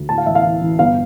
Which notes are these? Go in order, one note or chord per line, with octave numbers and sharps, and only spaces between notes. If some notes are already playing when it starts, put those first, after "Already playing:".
Already playing: D2
A2 A5
F5
A1 E5
F5
E3
A1
G1 F5